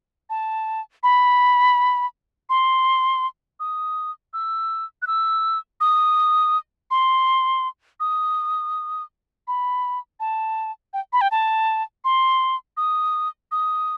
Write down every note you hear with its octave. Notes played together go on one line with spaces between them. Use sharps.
A5
B5
C6
D#6
E6
F#6
E6
D#6
C6
D#6
B5
A5
G5
B5
G5
A5
C6
D#6
D#6